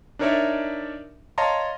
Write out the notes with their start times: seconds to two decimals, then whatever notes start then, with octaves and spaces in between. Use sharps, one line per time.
0.19 D4 D#4 A#4 C#5 D5 E5
1.38 C#5 D#5 F5 A5 A#5 C6